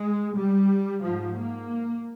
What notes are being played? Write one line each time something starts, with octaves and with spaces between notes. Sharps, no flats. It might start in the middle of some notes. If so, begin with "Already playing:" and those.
Already playing: G#3
G3
G#2 F3
A#3